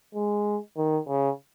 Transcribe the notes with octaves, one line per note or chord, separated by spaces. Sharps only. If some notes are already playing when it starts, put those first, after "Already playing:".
G#3
D#3
C#3